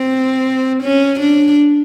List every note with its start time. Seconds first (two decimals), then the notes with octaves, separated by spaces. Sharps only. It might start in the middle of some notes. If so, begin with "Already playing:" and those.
Already playing: C4
0.83 C#4
1.20 D4